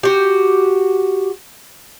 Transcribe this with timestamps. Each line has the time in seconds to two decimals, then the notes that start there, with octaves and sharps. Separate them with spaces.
0.03 F#4 G4